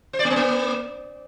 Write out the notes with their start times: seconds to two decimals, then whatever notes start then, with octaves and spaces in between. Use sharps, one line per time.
0.13 C5
0.19 D5
0.25 A#3
0.30 B3
0.36 A#3